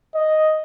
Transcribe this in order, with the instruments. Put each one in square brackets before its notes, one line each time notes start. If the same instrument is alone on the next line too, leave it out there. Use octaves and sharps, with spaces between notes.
[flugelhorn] D#5